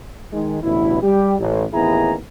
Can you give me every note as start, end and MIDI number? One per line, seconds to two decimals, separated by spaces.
0.33 0.57 51
0.33 0.57 56
0.63 0.99 33
0.63 0.99 38
0.63 0.99 47
0.63 0.99 64
1.03 1.35 55
1.03 1.35 67
1.39 1.65 33
1.74 2.15 33
1.74 2.15 39
1.74 2.15 59
1.74 2.15 64
1.74 2.15 68
1.74 2.15 82